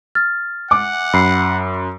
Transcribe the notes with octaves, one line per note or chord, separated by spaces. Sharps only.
F6 A6
F#5 D6
F#2 B5 C7